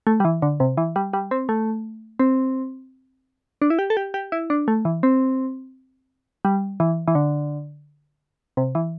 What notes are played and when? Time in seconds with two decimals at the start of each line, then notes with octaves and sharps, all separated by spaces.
0.07 A3
0.20 G3
0.25 E3
0.42 D3
0.60 C3
0.77 E3
0.96 G3
1.13 G3
1.31 C4
1.49 A3
2.19 C4
3.62 D4
3.70 E4
3.79 G4
3.90 A4
3.97 G4
4.14 G4
4.32 E4
4.50 D4
4.68 A3
4.85 E3
5.03 C4
6.45 G3
6.80 E3
7.08 E3
7.15 D3
8.57 C3
8.75 E3